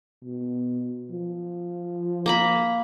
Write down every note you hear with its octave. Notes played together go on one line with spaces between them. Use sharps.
B2
F3
A#3 A#5 B5